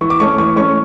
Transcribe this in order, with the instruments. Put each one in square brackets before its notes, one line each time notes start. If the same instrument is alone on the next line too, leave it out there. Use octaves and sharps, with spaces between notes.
[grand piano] E3 C#6
D6
A3 C#4 C#6
E3 C#6
A3 C#4 C#6